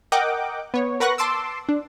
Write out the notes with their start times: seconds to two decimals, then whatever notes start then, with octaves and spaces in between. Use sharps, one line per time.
0.12 A#4 D#5 F#5 G5 D6
0.74 B3 C#5
1.00 A#4 B4 F#5 C#6 F#6 A#6
1.18 A5 C6 D6 E6
1.69 D4